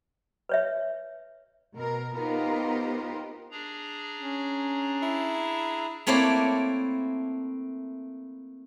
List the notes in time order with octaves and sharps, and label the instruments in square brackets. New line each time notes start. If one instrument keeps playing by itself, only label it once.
[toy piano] B4 C#5 E5
[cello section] B2 A#4
B3 D#4 F4 G4 A#4 C5
[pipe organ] D4 G#4 A#5
[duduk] C#4
[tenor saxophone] E4
[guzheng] A3 A#3 C4 E4 C#5 D5